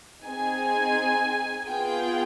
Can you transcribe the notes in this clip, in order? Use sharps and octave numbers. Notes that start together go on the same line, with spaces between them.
C4 D#4 G#4 G#5
B3 F4 G#4 G5